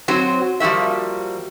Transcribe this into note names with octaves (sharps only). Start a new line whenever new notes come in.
F#3 C4 F#4 C5
F3 G3 A#3 F#4 E5